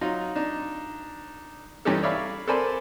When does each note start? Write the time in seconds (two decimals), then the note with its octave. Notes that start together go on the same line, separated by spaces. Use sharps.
0.01 F#3 D#4 F4
0.35 D4 D#4
1.85 G2 E3 C#4 D#4 G4 A4
2.03 C#5 D5 E5 F5 B5
2.48 A4 A#4 C5 D5 G#5 B5